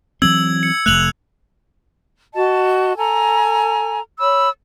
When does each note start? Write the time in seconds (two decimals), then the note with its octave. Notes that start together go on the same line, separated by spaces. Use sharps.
0.22 E3 F#3 C4 E6 G#6 F#7
0.63 C#7
0.86 F1 C#2 A3 F#6 F7 F#7
2.35 F#4 D#5 A5
2.96 A4 G#5 A#5
4.19 C#5 B5 E6